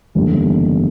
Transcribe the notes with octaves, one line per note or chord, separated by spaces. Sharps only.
F#1 E2 D3 G3